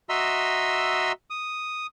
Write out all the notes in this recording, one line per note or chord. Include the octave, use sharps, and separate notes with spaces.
F#4 D#5 E5 A#5 C6 E6
D#6